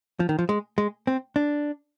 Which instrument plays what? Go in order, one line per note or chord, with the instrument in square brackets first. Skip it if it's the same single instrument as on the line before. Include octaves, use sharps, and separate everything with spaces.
[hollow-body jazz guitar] F3
D#3
F3
G#3
G#3
C4
D4